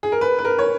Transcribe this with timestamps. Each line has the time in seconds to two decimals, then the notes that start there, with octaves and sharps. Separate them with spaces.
0.03 G#4
0.12 A#4
0.21 B4
0.39 B4
0.45 A#4
0.59 C#5